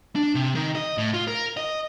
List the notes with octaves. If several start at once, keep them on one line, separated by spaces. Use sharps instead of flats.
D4
C3
D#3
D#5
A2
F4
A#4
D#5